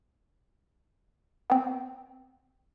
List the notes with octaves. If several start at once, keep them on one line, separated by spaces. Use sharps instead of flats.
B3 C4